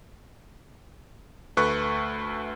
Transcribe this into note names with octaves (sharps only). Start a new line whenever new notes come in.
D2 A3 B4 C#6 F#6